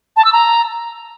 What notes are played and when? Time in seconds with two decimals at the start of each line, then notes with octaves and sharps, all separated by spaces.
0.17 A5
0.25 E6
0.33 A#5